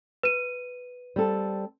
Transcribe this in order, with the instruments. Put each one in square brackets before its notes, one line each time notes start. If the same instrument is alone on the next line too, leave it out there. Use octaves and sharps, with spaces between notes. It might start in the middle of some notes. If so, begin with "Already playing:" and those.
[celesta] B4 D#7
[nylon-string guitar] G3 C4 A4